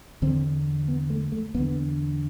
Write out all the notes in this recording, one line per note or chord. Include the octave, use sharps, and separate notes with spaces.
E2 D3 C4
B3
A3
A3
E2 D3 B3